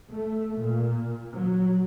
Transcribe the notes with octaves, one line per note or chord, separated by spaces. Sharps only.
A3
A#2
F#3